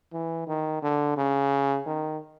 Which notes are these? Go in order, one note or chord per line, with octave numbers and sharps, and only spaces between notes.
E3
D#3
D3
C#3
D#3